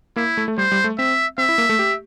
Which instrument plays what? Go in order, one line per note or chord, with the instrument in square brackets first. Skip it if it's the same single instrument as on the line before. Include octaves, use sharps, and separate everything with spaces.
[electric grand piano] A#3 [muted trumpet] E4
[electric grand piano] A3
A3
[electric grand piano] G3 [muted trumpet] C5
[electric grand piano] G3
A3
[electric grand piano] C4 [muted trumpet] E5
[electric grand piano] C4 [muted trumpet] E5
[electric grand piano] E4
A#3
A3
G4